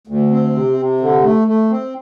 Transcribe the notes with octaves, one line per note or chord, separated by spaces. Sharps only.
D2
C4
C3
C3
D3
A3
A3
C4